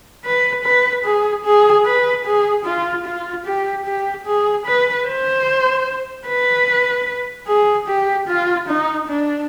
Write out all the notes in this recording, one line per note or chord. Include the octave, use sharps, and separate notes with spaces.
B4
B4
G#4
G#4
B4
G#4
F4
F4
G4
G4
G#4
B4
C5
B4
G#4
G4
F4
D#4
D4